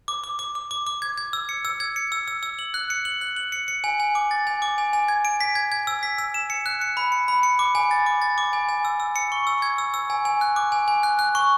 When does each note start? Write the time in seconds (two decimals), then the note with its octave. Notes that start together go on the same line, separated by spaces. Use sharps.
0.08 D6
0.24 D6
0.39 D6
0.55 D6
0.71 D6
0.87 D6
1.02 G#6
1.18 G#6
1.33 E6
1.49 C#7
1.65 E6
1.80 G#6
1.96 C#7
2.12 E6
2.28 E6
2.43 E6
2.59 F#7
2.74 F#6
2.90 C#7
3.05 F#7
3.21 F#6
3.37 F#7
3.52 C#7
3.68 C#7
3.84 G#5
4.00 G#5
4.15 D6
4.31 A6
4.47 G#5
4.62 D6
4.78 G#5
4.93 G#5
5.08 G#6
5.25 D7
5.41 B6
5.55 G#6
5.72 G#6
5.87 E6
6.03 B6
6.18 E6
6.34 E7
6.50 C#7
6.66 F#6
6.81 C#7
6.97 B5
7.12 C#7
7.28 B5
7.43 C#7
7.59 D6
7.75 G#5
7.91 A6
8.06 D6
8.22 A6
8.38 D6
8.53 G#5
8.69 G#5
8.85 E6
9.00 E6
9.16 C#7
9.32 C#6
9.47 E6
9.62 G#6
9.78 E6
9.94 E6
10.10 G#5
10.25 G#5
10.41 F#6
10.56 D6
10.72 G#5
10.88 G#5
11.03 F#6
11.19 F#6
11.35 C#6